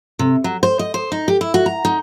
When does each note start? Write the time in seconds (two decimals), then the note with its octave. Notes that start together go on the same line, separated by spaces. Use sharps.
0.19 C3
0.44 F#3
0.63 C5
0.79 D#5
0.94 C5
1.12 D#4
1.28 G4
1.41 E4
1.54 F#4
1.66 A#5
1.85 D#4